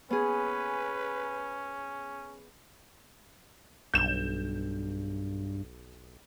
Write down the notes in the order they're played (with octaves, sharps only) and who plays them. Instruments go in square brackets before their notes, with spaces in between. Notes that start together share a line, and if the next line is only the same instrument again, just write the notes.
[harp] B3 G#4 [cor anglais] C#4 [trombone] B4
[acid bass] B1 [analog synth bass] G2 [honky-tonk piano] G6 E7